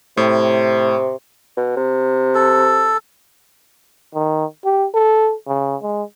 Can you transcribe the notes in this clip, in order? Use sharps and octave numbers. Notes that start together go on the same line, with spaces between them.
A2 C3
B2
C3
A4
D#3
G4
A4
C#3
G#3